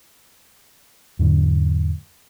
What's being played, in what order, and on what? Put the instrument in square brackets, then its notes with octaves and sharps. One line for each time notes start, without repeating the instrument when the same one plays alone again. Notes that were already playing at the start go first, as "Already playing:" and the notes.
[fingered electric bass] E2 G#2 D3 F#3